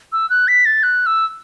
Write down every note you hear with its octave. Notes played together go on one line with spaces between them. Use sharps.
E6
F#6
B6
A6
F#6
E6